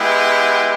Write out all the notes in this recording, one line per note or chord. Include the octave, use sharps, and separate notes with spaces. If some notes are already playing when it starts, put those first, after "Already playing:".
Already playing: G#3 B3 E4 G4